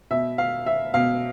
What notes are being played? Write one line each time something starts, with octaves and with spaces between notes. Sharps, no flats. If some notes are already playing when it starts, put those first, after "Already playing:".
B2 E5
F5
E5
B2 F5